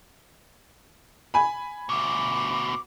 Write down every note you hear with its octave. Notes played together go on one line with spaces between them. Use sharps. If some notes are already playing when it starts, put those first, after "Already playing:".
G#5 B5
D2 B2 D6